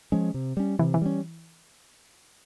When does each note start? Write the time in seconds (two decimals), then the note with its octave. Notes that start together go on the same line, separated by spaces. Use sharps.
0.12 F3 G#3 C#4
0.34 C3
0.57 G3 C#4
0.79 C3 E3
0.94 E3
1.02 G3 C#4